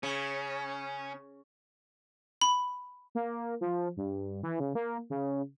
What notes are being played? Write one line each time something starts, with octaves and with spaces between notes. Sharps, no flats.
C#3 C#4
B5
A#3
F3
G2
E3
C#3
A#3
C#3